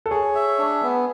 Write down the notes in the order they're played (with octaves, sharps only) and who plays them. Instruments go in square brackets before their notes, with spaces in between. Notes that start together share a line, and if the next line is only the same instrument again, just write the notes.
[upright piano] A4
[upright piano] G#4 [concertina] C#5
[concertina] E5
D4
B3